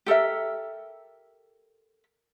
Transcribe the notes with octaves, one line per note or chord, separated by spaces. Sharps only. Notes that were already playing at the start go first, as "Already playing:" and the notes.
G4 A4 A#4 E5